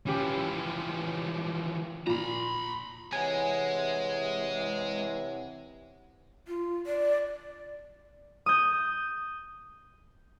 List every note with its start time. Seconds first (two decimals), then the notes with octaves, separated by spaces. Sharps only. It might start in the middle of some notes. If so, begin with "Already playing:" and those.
0.07 E3 F3 C#4 G4
2.07 A#2 A#5 B5
3.13 C3 E3 G#3 C#5 F#5 G#5
6.48 F4
6.86 D5
8.46 D#6 G6